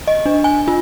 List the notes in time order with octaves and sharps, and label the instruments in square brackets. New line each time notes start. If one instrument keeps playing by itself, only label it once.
[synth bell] D#5
D4
G#5
F4